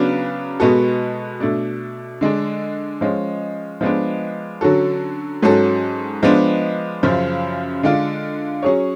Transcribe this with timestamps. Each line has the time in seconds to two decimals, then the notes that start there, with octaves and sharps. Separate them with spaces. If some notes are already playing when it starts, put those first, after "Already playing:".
Already playing: C#3 F#3 B3 D4
0.60 B2 G#3 B3 F#4 A4
1.40 B2 A3 D4
2.21 D3 G#3 D4
3.01 F3 G#3 C#4
3.81 F3 G#3 B3 D4
4.61 D3 F#3 C#4 F#4 A4
5.43 G#2 F#3 C#4 F#4 A4
6.23 F3 G#3 B3 D4
7.03 F#2 C#3 F3
7.83 D3 G#3 D4 F4
8.63 F#3 C#4 G#4 C#5